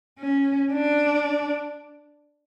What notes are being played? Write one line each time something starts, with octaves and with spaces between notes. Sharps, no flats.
C#4
D4